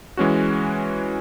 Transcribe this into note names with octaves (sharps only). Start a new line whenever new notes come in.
E3 G#3 C#4 F#4